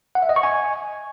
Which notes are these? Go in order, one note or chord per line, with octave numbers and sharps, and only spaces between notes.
F#5
E5
D#5
C#6
G#5